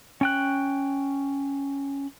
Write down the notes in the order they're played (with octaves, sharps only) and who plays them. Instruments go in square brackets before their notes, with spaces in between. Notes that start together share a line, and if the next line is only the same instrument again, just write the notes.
[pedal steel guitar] C#4 G5 F#6